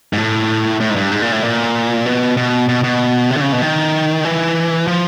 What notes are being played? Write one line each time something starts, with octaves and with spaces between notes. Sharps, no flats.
G#2
A2
A2
G#2
G2
G#2
A#2
A2
A#2
B2
B2
B2
B2
C3
D3
C#3
B2
D#3
E3
F3